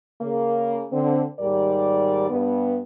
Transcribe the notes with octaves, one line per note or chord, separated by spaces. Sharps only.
C#3 A#3
D3 C4
D#2 G#2 G3 A#4 D5
G2 B3